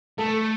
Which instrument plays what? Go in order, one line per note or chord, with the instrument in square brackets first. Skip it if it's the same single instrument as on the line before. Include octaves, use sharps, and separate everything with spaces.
[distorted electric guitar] A3 [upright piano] A4